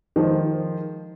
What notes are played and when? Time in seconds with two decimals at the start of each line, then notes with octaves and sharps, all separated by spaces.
0.16 D#3 F3 G#3 C5